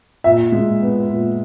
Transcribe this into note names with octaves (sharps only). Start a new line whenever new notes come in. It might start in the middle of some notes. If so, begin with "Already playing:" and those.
A#2 E5
G#3
B3
A#2